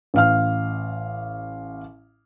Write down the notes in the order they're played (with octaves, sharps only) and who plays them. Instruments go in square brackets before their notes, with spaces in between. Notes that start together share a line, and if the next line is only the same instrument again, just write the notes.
[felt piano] A1 F5 F6